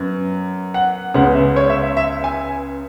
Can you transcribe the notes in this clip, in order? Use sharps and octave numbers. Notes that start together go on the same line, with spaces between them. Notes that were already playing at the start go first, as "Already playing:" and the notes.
Already playing: F#2 B3
F#5
C#2 C#3 G#3 B3 F#5
E5
C#5
E5
E5
E5
G#5